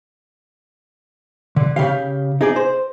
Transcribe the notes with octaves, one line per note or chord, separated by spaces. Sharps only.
D3
C#3 G4 F5
D#4 G#4 D5
C5